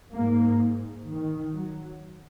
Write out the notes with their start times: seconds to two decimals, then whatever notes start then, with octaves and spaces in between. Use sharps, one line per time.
0.14 G#2 A#3
1.07 D#3
1.52 F#3